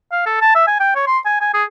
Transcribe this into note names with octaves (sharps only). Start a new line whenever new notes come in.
F5
A4
A5
E5
G#5
G5
C#5
C6
G#5
G#5
G#4